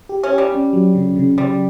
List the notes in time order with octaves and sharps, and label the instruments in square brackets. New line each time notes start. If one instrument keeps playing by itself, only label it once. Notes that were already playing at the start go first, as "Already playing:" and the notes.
[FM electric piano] G4
[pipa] C#4
[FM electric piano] G4
[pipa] G3
[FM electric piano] C#4
F#3
C#3
C#3
[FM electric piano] C#3 [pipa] G3